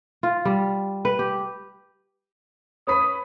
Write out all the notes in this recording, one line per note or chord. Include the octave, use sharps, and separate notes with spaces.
F4
G3
B4
G4
C#4 B4 D#6 B6